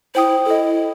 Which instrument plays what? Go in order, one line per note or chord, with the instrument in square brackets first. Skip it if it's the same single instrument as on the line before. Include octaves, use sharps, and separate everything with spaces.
[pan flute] E4 [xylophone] C5 G5 D#6
[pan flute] E4 [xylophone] A4 D#5